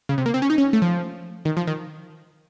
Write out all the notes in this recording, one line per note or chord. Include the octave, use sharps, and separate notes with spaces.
C#3
C3
A#3
C4
C#4
D#4
C#4
A3
F3
D#3
F3
D#3